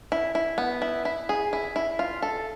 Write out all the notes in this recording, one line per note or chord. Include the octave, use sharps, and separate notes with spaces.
E4
E4
B3
E4
E4
G#4
E4
E4
F4
A4